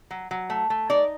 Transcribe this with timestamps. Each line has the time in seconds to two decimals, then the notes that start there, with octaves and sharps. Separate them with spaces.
0.11 F#3
0.31 F#3
0.50 A3
0.70 A3
0.90 D#4 D5